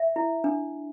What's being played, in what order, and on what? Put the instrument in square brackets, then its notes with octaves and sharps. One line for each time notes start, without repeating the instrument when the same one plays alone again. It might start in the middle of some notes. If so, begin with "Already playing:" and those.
Already playing: [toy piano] E5
E4
D4